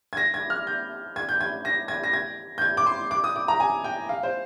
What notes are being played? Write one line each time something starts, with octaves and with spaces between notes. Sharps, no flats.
G#6
A#6
G#6
F6
G6
G#6
G6
G#6
A#6
G#6
A#6
G#6
G6
G#6
D6
C6
D6
D#6
D6
A#5
G#5
G5
F5
C5